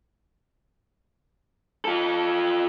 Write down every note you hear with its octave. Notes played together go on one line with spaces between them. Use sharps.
F4 A4